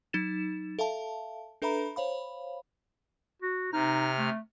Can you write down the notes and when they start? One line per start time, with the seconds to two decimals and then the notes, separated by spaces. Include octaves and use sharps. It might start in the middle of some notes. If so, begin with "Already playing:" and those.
0.13 F#3 D#4 A6 E7
0.79 A4 E5 F5 A5
1.62 D4 A4 B4 E5 A#5 B5
1.96 C5 C#5 F5 B5
3.42 F#4
3.73 C3 D#4 F6
4.18 A3